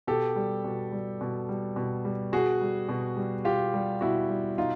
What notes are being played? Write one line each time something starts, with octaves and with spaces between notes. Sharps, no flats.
B2 G4 A4
G3
B2
G3
B2
G3
B2
G3
B2 F#4 G#4
G3
B2
G3
B2 F4 G4
G3
B2 E4 F#4
G3
B2 D#4 F4